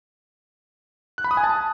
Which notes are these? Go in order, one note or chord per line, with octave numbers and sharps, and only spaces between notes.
F#6
B5
D#6
G#5
A5